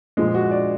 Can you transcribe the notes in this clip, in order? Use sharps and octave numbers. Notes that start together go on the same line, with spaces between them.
A#2 F3 G#3 G#4
F#4
D5